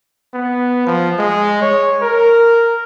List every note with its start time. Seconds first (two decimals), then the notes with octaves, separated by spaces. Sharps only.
0.34 B3
0.86 F3
1.18 G#3
1.62 C#5
2.02 A#4